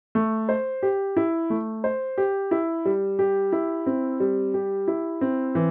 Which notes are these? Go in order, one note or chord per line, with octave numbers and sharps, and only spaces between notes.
A3
C5
G4
E4
A3
C5
G4
E4
G3
G4
E4
C4
G3
G4
E4
C4
E3